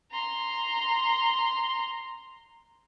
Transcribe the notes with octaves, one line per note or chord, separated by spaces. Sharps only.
A#5 C6